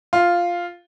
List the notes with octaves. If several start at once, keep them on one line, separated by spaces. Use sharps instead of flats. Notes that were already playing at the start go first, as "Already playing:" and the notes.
F4